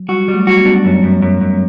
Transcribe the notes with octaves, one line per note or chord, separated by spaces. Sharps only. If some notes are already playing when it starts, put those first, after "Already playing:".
Already playing: F#3
G3 F#4
G3
F#3 A3
F#4
G3 B3
D4
F#2
F#2
F#2
F#2